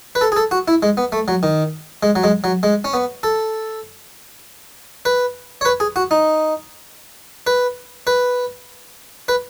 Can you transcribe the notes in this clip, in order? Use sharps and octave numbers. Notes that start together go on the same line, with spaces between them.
B4
A4
G#4
A4
F#4
E4
G#3
B3
A3
F#3
D#3
G#3
F#3
G#3
F#3
G#3
C#4
B3
A4
B4
C#5
B4
G#4
F#4
D#4
B4
B4
B4